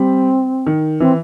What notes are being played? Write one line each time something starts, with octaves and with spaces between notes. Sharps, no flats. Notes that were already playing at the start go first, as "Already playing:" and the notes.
Already playing: G3 C4
D#3
E3 C4